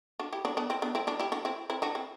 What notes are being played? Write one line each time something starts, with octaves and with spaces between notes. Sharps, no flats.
D4 F#4
E4 G4
D4 F#4
B3 D4
C4 E4
B3 D4
C4 E4
D4 F#4
E4 G4
D4 F#4
C4 E4
C4 E4
D4 F#4
C4 E4